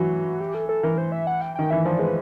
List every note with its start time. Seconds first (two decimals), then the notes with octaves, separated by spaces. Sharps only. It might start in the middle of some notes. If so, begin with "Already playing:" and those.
Already playing: E3 F#3 F#4
0.40 G4
0.54 A4
0.69 A4
0.83 E3 A#4
0.98 C5
1.12 E5
1.27 F#5
1.42 G5
1.55 D#3 G5
1.71 E3 E5
1.85 F3 D5
1.99 G#3 B4